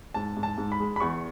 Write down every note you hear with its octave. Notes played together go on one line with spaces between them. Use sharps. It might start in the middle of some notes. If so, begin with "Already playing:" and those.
G#2 A5
G#2
A5
G#2
B5
G#3
B5
E2 C#6